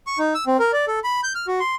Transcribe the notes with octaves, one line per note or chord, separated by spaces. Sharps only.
C#6
D#4
E6
C4
A#4
D5
A4
B5
G6
F6
F#4
C6